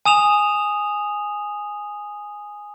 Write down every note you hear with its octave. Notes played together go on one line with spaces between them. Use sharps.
G#5 D#6 E7 F7